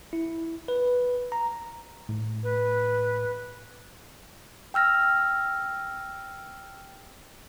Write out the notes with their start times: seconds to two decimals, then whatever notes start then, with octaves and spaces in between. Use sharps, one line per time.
0.13 E4
0.68 B4
1.32 A#5
2.09 A2
2.43 B4
4.74 G5 E6 F6 A#6